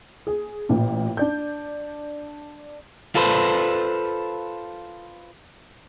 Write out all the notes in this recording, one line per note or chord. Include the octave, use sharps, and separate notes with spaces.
G#4
A1 A#2
D4 D5 G6
F4 A4 B4 C5